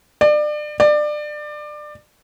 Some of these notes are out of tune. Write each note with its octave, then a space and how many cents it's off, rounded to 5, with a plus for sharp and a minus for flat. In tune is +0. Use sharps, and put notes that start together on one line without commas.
D5 +30
D5 +25